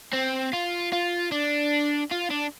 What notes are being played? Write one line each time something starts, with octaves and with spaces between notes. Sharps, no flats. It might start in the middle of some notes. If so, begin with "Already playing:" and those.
C4
F4
F4
D4
F4
D4